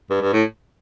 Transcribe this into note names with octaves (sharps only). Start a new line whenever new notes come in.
G2
G2
A2